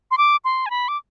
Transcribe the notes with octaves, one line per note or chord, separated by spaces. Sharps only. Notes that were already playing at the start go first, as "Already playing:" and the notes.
C6
D6
C6
G#5
B5
D6